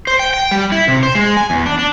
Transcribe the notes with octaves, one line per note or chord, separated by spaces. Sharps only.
C5
G5
G5
G3
E4
C3
C5
G#3
G#5
E2
D4
D4